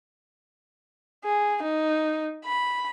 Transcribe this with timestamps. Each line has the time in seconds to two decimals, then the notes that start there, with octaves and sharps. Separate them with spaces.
1.24 G#4
1.62 D#4
2.45 B5